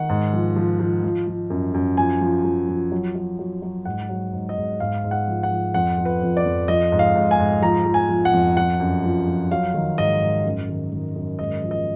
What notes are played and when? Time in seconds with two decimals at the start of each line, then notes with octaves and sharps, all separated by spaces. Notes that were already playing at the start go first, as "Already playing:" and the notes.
Already playing: D#3 F#5
0.09 G#2
0.33 F3
0.56 F3
0.80 F3
1.04 F3
1.27 F3
1.50 F#2
1.74 F#2
1.97 F3 G#5
2.21 F3
2.44 F3
2.68 F3
2.92 F#3
3.15 F#3
3.39 F#3
3.62 F#3
3.85 G#2 F#5
4.09 F#3
4.33 G#2
4.49 D#5
4.57 G#2
4.80 G#2 F5
5.04 G#2
5.11 F#5
5.27 F3
5.43 F#5
5.51 F3
5.74 F2 F#5
5.98 F3
6.05 B4
6.22 F2
6.37 D5
6.45 F2
6.68 F3 D#5
6.92 G#2
6.99 F5
7.16 G#2
7.31 G#5
7.39 G#2
7.62 F3 A#5
7.86 F3
7.94 G#5
8.09 F3
8.25 F#5
8.33 F2
8.57 F3 F#5
8.80 F#2
9.04 F3
9.27 F3
9.51 F#3 F5
9.74 D#3
9.98 G#2 D#5
10.21 G#2
10.45 F#2
10.69 D#3
10.92 D#3
11.16 F#2
11.39 G#2 D#5
11.63 F3
11.71 D#5